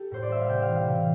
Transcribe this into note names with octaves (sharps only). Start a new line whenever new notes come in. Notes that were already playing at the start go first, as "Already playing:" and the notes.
Already playing: G4 A4
A2 C5
D5
G3 E5
F5
C3 G5
F5
E3
F5
C3